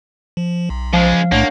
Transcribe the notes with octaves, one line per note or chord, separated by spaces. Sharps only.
F3
B1
C#3 F3 G#3 F5
B1 A2 A3 A#3 D4 C#5 F#5